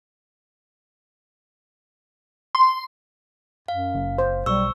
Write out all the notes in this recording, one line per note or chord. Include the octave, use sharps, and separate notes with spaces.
C6
F#2 F5
F#1
C5
B1 G3 C#6 E6